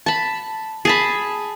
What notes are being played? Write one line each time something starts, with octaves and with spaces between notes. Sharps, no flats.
A5 B5
G#4 A5 B5